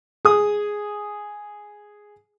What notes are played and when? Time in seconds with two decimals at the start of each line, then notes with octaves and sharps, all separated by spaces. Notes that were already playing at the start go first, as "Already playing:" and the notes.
0.25 G#4 D#6